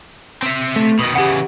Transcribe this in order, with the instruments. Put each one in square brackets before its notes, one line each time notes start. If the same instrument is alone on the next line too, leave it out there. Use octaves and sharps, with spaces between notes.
[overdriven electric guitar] C4 E5
[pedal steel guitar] A3
[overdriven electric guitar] B2 D#3 [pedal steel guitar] B5 D#6
[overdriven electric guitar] C#3 E3 [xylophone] G4 F#5